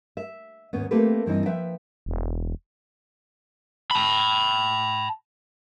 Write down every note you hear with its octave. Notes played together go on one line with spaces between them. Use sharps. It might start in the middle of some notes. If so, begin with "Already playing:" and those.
E5
D#2 G#2 B3 C#4
A3 A#3 C4 G4 A4 B4
G2 E3 C4 D#4
F3 B4 E5 G5
E1
A5 B5